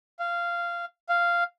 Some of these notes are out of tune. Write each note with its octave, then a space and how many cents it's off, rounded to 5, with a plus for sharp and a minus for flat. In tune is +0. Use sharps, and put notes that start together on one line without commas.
F5 -15
F5 -10